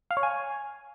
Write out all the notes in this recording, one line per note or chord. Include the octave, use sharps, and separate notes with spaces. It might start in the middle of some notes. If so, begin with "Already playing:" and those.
F5
C#5
G#5